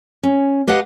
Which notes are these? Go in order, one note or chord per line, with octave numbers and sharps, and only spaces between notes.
C#4
G4 B4 D#5 F5 F#5 A5